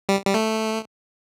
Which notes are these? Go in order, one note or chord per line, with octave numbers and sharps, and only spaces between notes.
G3
G3
A3